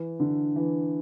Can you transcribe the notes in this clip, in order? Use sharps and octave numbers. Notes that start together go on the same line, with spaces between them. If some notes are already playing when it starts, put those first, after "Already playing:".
Already playing: E3
D3
E3